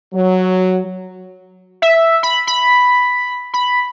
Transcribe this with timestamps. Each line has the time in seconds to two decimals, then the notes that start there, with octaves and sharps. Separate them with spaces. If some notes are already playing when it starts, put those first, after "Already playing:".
0.13 F#3
1.82 E5
2.23 B5
2.47 B5
3.54 B5